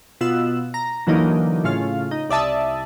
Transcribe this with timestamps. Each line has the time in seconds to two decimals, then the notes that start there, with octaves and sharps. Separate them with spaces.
0.21 B2 F4 E6 F#6
0.74 A#5
1.07 D3 E3 F#3 A#3 D#4
1.64 A2 C#3 F4 F6
2.11 D#4
2.29 C2 D5 E5 A5 D#6